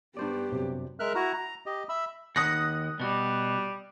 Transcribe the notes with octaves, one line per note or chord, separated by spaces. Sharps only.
G2 B3 G4 C5 D5
F#2 C3
G#3 A#4 E5 F6 F#6
E4 F#4 A#5
A#5
G4 D#5
E5 B5 E6
D#2 F#5 D#6 F#6 A#6
B2 G3 F#4